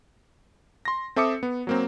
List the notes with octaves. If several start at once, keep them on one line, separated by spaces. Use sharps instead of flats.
C6 A#6
C4 A4 E5 D6 D#6 C#7
B3
F#3 A#3 C4